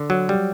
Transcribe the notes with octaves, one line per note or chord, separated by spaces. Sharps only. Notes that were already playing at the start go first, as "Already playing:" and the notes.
Already playing: D3
F#3
G3